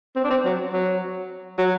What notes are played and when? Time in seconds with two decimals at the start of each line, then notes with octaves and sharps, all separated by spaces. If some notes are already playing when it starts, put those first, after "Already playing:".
0.16 C4
0.24 D4
0.31 C4
0.45 F#3
0.73 F#3
1.58 F#3